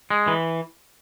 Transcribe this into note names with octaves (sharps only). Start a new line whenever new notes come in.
G#3
E3